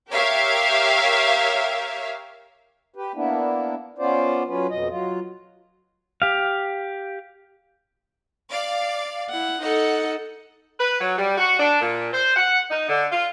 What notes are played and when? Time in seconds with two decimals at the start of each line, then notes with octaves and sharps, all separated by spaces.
0.10 G4 A#4 C#5 E5 F5
2.95 G4 B4
3.15 A#3 B3 D4 E4
3.98 B3 C#4 F4 C5 D5
4.48 F#3 C#4 F4 B4
4.70 F2 B2 D#5
4.89 F#3 F4
6.22 G4 F5
8.49 D5 F5
9.30 E4 F#5
9.62 D#4 A4 F#5
10.79 B4
11.00 F#3
11.18 G3
11.38 F#4
11.59 D4
11.80 A#2
12.13 C5
12.35 F#5
12.70 D#4
12.88 D3
13.11 F4